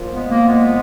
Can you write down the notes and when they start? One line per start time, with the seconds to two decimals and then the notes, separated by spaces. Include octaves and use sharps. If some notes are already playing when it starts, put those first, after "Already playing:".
Already playing: A#2 F3
0.11 G#3 B3
0.30 A#3
0.47 G#3 B3